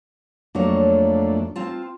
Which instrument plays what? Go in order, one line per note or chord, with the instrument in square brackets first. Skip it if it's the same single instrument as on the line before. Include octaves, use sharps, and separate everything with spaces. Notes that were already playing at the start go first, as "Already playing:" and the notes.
[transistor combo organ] F2 A3 D4 [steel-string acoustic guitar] F#3 A#3 C#5
[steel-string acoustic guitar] C4 F4 A5